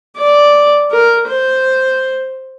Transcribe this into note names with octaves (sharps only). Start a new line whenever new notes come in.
D5
A#4
C5